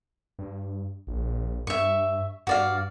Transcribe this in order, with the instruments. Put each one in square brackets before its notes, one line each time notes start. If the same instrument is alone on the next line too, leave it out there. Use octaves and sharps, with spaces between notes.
[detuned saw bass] G2
A#1
[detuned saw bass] G2 [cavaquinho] E5 C#6
[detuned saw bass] G2 [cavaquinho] F#4 D5 F5